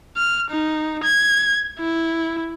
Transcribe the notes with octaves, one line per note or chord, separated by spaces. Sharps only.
F6
D#4
G#6
E4